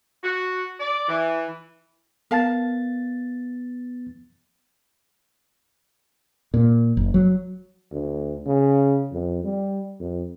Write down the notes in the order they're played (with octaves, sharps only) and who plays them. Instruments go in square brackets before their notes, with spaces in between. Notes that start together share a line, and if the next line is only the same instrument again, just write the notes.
[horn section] F#4
D5
E3
[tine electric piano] B3 A6 [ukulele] A#4 F5 A5
[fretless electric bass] A#2
F#1
F#3
[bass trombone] D2
C#3
F2
G3
F2